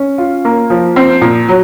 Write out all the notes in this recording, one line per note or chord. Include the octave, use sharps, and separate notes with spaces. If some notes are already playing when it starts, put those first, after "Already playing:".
Already playing: C#4
F4
A#3
F3
C4
A#2
F#3